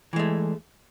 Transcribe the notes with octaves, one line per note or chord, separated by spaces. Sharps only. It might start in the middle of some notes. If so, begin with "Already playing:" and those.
E3 G#3 A3